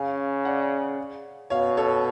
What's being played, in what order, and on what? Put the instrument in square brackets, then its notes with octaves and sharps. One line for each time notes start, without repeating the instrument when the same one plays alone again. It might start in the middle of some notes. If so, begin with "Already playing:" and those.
Already playing: [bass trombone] C#3 [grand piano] F5 G#5
[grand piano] D5 F#5
[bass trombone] B2 [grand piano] C#5 F5
[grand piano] A4 C#5